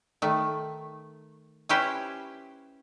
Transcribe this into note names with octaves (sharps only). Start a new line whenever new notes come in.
D#3 A3
C#4 E4 G4 B4 C5